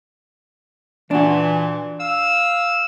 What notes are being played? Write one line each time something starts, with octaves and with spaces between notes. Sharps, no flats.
A#2 E3 D4 F#4
F5 E6